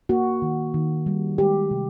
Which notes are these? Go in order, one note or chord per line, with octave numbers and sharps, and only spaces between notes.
A#3 F#4
D#3
D#3
G3
G#3 G4
C3